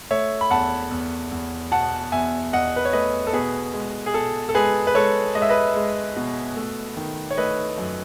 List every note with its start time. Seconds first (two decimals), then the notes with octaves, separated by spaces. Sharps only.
0.11 A3 C#5 E5
0.41 B5
0.51 E2 F#5 A5
0.91 E2
1.31 E2
1.71 B2 F#5 A5
2.12 E2 E5 G#5
2.53 E2 D#5 F#5
2.76 B4
2.85 C#5
2.93 A3 B4 D#5
3.27 A4
3.33 B2 G#4 B4
3.74 G#3
4.06 G#4
4.14 B2 A4
4.49 A4
4.55 G#3 G#4 B4
4.87 B4
4.95 G#3 A4 C#5
5.35 G#3 D#5
5.42 E5
5.49 B4 D#5
5.75 G#3
6.17 B2
6.56 A3
6.97 D#3
7.31 C#5
7.37 A3 B4 D#5
7.78 F#2